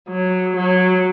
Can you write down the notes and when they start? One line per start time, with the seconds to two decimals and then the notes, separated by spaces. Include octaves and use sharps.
0.09 F#3
0.55 F#3